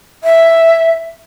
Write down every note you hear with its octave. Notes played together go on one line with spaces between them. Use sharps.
E5